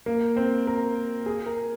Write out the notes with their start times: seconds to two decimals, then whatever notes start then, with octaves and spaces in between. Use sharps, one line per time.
0.06 A#3
0.36 C4
0.67 A#4
1.26 G#4
1.46 A#4